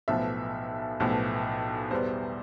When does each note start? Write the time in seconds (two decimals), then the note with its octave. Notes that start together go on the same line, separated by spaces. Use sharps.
0.08 B1 A2 F3 B3 E5
1.00 B1 A2 F3 B3
1.91 E2 B2 G3 B3 C5